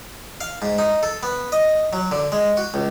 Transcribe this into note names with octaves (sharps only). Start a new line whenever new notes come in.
F5
G#2
D#4
A4
B3
D#5
F#3
D3
G#3
F#4
C#2